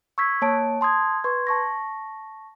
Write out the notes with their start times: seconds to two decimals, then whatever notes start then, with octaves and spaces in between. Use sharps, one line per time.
0.18 C#6 E6 G#6 B6
0.42 A#3 C#5 A5 D7
0.81 A5 C6 D#6 G#6
1.24 B4 C6 C#6 G#6
1.47 A5 C#6 A#6